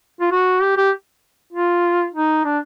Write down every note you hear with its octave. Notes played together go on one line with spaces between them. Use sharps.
F4
F#4
G4
G4
F4
D#4
D4